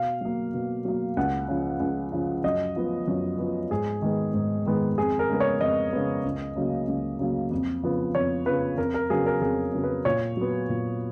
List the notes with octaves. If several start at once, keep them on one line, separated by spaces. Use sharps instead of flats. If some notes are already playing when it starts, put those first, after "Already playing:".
Already playing: B2 F5
F#3 A#3
B2
F#3 A#3
C#2 F#5
C#3 F3
C#2
C#3 F3
F#2 D#5
F3 B3
F#2
F3 B3
G#2 G#4
D#3 G#3 B3
G#2
D#3 G#3 B3
F2 G#4
A#4
C#3 G#3 B3
C#5
F2 D#5
C#3 G#3 B3
C#2
C#3 F#3 A#3
C#2
C#3 F#3 A#3
F2
C#3 F3 B3
F2 C#5
C#3 F3 B3 B4
F2 A#4
A#4
C#3 F#3 B3 G#4
A#4
F2 G#4
C#3 F#3 B3
B4
A#2 C#5
F#3 B3
A#2